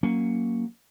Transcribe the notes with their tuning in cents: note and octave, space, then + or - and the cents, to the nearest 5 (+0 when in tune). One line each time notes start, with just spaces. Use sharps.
F#3 +0 A#3 +0 C#4 +0